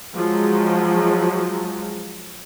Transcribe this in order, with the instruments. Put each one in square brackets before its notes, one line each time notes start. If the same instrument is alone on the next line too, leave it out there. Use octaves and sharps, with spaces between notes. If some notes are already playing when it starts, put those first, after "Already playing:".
[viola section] F3 F#3 G#3